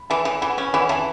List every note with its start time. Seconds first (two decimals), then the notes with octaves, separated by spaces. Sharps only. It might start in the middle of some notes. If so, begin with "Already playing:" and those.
Already playing: B5
0.10 E3 E5 A5
0.25 E3
0.42 E3 F#5 B5
0.58 C#4
0.73 E3 F#5 B5
0.89 E3 E5 A5